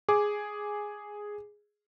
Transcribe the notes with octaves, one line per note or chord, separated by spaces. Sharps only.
G#4 D6